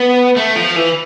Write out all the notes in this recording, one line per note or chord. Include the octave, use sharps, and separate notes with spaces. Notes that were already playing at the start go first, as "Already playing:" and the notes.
Already playing: B3
A3
F3
E3